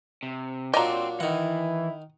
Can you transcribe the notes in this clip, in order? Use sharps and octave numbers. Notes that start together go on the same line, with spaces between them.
C3
A#2 F#3 D4 D#5 G5 A#5 C6
D#3 E3 E4 F#5